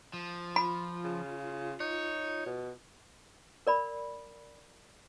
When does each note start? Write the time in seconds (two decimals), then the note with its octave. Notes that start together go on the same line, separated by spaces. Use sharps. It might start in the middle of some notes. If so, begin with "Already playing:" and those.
0.14 F3
0.56 F4 B5
1.04 C#3
1.80 D#4 C#5
2.46 B2
3.67 A#4 D5 B5